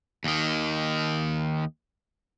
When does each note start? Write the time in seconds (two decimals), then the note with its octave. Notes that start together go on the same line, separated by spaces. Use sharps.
0.24 D#2 D#3